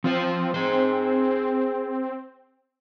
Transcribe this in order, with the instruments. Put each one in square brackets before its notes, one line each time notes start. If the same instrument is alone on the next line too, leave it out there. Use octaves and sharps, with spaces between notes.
[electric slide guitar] F3 F4 C5 [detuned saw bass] C4
[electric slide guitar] G#4 C5